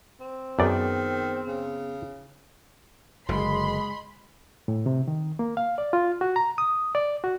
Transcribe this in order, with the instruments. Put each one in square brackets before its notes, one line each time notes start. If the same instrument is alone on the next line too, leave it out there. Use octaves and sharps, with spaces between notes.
[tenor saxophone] C4
[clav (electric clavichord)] F#2 D5 [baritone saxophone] D#3 [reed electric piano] B3 G#4
[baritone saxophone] C#3
[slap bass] F#1 D3 [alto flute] G#3 [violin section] B5 C6
[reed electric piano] A2
C3
D#3
A#3
F5
D5
F4
F#4
A#5
D#6
D5
F#4